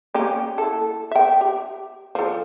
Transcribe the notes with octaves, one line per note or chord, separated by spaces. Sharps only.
A#3 C#4 G4
E4 A4
E5 G5
G4
F3 A4